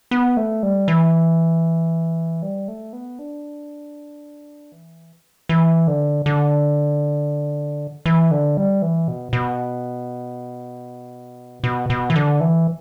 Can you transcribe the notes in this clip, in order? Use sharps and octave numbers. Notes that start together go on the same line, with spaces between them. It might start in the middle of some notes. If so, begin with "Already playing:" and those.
B3
A3
G3
E3
G3
A3
B3
D4
E3
E3
D3
D3
E3
D3
G3
E3
B2
B2
B2
B2
E3
D3
E3